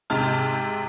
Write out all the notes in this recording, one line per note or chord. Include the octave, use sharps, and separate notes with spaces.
G#2 C3 A5 F6